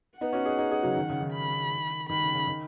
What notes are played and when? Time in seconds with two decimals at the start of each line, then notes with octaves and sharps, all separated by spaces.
0.20 B3 D#4 F#5
0.33 C#4 F#4
0.45 D#4 G#4
0.58 D#4 G#4
0.71 D#4 G#4
0.83 C#3 F#3
0.97 D#3
1.09 C#3
1.21 D#3
1.33 B5
2.09 D#3 B5
2.22 C#3
2.34 C#3
2.47 D#3